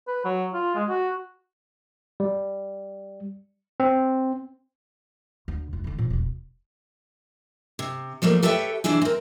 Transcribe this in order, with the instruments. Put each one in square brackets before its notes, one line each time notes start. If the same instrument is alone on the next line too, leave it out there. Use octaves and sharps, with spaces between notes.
[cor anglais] B4
F#3
F4
G#3
F#4
[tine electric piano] G3
C4
[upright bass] D2
F1 F4
D3 E4
A#2 F3
E1 B2
[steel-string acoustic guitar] C3
F3 G3 A3 A#3
G4 A4 B4 C#5 E5 G5
C3 E3 D4 E4 G#4
C4 A#4